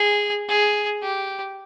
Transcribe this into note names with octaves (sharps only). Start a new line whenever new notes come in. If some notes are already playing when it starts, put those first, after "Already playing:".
Already playing: G#4
G#4
G4